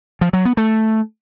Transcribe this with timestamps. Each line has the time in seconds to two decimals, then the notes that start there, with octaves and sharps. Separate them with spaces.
0.21 F3
0.33 F#3
0.45 B3
0.57 A3